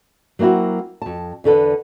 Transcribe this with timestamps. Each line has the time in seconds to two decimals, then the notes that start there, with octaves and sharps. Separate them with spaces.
0.39 F#3 A#3 C4 E4 F#4
1.02 F2 A5
1.44 E2 D3 A4 B4